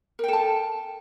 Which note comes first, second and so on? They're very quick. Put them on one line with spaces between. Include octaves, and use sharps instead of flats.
A#4 G5 A4 A5